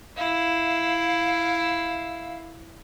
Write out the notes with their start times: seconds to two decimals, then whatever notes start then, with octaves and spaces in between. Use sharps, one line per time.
0.17 E4 F5